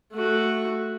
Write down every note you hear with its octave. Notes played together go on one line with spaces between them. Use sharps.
A3 F#4